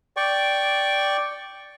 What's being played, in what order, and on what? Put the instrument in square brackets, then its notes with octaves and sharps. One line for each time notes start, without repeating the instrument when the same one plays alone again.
[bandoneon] D5 G5 C#6